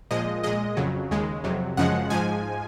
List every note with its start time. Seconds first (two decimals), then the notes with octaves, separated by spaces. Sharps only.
0.11 A#2 F3 G#3 D#5
0.44 A#2 G#3 D#5
0.77 F2 C#3 F#3
1.11 D#2 C#3 G#3
1.44 F2 C3 F#3
1.77 F#2 C#3 F3 G#3 F#5
2.10 G#2 F3 G#3 G#5